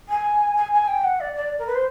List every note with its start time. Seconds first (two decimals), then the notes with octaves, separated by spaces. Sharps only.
0.08 G#5
0.56 G#5
0.72 G#5
0.87 G5
1.03 F#5
1.20 D5
1.35 D5
1.58 A#4
1.66 B4
1.74 C5